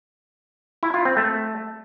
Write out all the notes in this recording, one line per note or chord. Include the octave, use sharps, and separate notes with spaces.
E4
F4
C4
A3